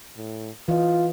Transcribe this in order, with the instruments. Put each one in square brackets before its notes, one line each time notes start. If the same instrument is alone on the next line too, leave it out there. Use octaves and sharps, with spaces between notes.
[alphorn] A2
[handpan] E3 D#5 [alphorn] F4